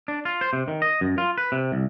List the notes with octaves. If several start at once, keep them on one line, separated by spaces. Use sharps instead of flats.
D4
F4
C5
C3
D#3
D#5
F#2
F4
B4
C3
C2